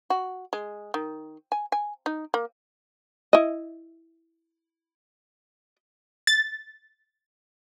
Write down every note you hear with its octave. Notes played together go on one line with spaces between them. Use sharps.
F#4
G#3
D#3
G#5
G#5
D#4
A#3
E4 D#5
A6